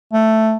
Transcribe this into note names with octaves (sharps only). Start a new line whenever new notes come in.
A3